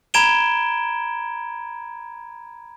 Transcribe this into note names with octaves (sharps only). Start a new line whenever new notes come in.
A#5 B5 G#6 D7 E7 G7